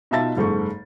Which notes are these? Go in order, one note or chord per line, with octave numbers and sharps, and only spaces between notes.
B2 D#4 F4 E5 A5 A6
F#1 G#2 A4 C#6